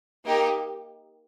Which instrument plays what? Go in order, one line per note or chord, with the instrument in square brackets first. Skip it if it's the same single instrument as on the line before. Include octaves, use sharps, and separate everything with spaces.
[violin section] A#3 D#4 G4